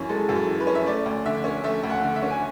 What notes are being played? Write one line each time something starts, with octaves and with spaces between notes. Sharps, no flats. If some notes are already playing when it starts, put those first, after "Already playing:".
Already playing: F#2 E3 C#4
G#3 A4
F#2
A4
E3
B4
C#4
E5
A3 D5
D2
D3 E5
C#4
A3 E5
D2
F#5
D3
E5
C#4
G#5